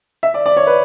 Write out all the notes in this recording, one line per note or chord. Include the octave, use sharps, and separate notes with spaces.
E5
D5
D5
C#5
B4